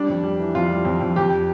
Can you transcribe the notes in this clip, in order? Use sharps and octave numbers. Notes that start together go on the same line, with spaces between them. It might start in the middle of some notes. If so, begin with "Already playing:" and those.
Already playing: G3 D4
F2
G3
E3
F2 F4
G3
F2
F2
F2 G4